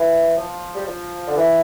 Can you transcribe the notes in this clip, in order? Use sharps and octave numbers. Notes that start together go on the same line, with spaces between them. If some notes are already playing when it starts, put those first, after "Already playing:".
Already playing: E3
F3
G3
F3
D3
E3